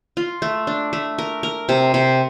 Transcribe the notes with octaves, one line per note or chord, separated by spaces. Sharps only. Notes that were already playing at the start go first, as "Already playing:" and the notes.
F4
A3
D4
A3
A#4
A#4
C3
C3